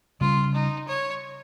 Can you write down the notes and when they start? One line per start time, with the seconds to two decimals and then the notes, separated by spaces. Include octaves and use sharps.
0.20 C#3 G3 C#4 F4
0.54 D#4
0.88 C#5